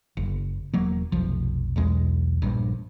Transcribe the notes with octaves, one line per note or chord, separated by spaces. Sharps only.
F#1
E1 F#3 A#3
F1 B1 F3
B1 E2 G#3
A#1 G2